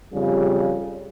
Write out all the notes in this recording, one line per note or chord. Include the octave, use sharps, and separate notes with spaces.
F2 C#3 G3